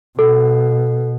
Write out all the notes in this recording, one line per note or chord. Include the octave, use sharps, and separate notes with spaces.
B2 A4